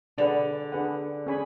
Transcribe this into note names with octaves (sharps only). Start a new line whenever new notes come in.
D3 D4 G#4 B4 F#5
D4 G#4 B4 F#5
C#4 G#4 C#5 G#5 B5